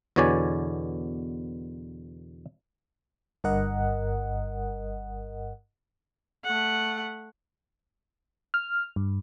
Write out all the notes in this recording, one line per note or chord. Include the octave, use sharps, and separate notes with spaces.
E2 B2 D3 C#5 D5 G#5
G1 G2 A#4 D#5 F#5
A3 F#5
F6
G2